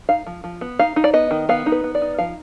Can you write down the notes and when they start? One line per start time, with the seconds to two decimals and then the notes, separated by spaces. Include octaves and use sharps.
0.09 D#4 F5
0.26 F3
0.44 F3
0.61 B3
0.79 D#4 F5
0.96 D#4
1.04 D5
1.13 B3 D#5
1.31 D#3
1.49 B3 F5
1.66 D#4
1.72 B4
1.84 B3
1.95 D5
2.02 D#4
2.18 F3 F5